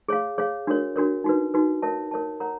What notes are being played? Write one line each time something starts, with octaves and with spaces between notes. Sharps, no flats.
G#4 C#5 F5
G#4 C#5 F5
D4 F#4 A#4 C#5
D4 F#4 A#4 C#5
D#4 F#4 B4
D#4 F#4 B4
A#4 C#5 E5 A5
A#4 C#5 E5 A5
A#4 C#5 F#5 A#5